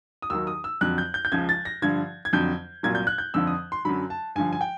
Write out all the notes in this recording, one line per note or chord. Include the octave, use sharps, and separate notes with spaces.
D#6
D#2 D#3 F#3 E6
D#6
E6
F2 D3 F#3 F#6
G6
G6
G6
C#2 C#3 F3 G#6
A6
A#6
G2 D3 F3 G#6
G#6
F2 D3 F#3 G6
C2 A#2 F#3 G#6
G6
F#6
G6
F2 D3 F3 E6
D#6
C6
F#2 D3 F#3 B5
A5
G2 D3 F3 G#5
G#5
G5